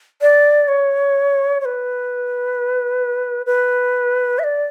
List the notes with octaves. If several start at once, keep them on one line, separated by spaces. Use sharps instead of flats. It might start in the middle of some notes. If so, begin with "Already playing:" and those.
D5
C#5
C#5
B4
B4
E5
D5